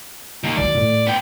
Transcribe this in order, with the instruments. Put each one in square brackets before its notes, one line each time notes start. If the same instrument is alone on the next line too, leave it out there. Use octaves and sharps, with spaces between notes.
[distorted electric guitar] D#3 A#3
[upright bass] D#3 F#3 [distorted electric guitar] D5
[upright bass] A2
[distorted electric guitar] B3 G5